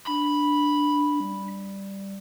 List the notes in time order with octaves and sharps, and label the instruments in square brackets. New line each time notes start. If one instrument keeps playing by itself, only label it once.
[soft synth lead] D4 [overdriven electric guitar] B5
[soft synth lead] G3